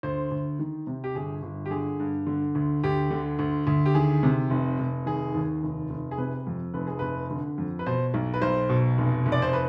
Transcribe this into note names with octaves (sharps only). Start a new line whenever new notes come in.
D2 C5
D2
D#3
C3
G4
G1 G#4
G1
G4
D3 G#4
G2
D3
D2
D2 G4
D3
D2
D2
G4
D#3 G#4
C3
F1
F1
D#3 G#4
D#2
F1
F1
G#4
C3 B4
F2
F1 B4
G#4
F1 B4
D3
F2
B4
B2 C5
B1
B4
B1 C5
B2
F1
F1
D5
C5
B4